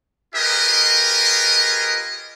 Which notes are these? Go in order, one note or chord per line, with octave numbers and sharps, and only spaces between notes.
F4 G4 G#4 A#4 B4 D#5